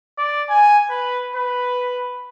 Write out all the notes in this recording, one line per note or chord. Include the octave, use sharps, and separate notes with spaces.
D5
G#5
B4
B4